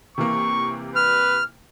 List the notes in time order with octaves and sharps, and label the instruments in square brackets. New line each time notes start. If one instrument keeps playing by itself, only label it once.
[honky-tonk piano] C3 E3 A#3 [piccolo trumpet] C#6
[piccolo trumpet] B4 [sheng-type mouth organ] F6